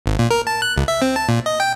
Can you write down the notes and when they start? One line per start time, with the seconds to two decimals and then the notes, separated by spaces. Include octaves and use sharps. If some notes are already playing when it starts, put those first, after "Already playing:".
0.06 G#1
0.19 A#2
0.31 A#4
0.47 A5
0.62 F#6
0.77 C#2
0.88 E5
1.02 C4
1.16 A5
1.29 A#2
1.46 D#5
1.60 G5